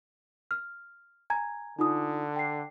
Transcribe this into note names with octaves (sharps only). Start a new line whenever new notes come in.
F6
G#5 A#5 G#6
D3 D#4 F4 D#6
G5 C7